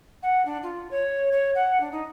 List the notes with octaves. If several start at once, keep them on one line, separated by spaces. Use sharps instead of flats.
F#5
D4
F4
C#5
C#5
F#5
D4
D#4